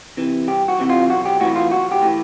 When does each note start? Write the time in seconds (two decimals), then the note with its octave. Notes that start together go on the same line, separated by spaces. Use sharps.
0.17 C3 E3
0.48 C2 G4
0.68 F#4
0.79 C3 E3
0.90 F4
1.09 B1 F#4
1.25 G4
1.40 A2 E3 F#4
1.56 F4
1.71 B1 F#4
1.92 G4
2.02 A2 E3